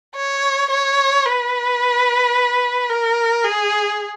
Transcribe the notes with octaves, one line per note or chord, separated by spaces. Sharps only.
C#5
C#5
B4
A#4
G#4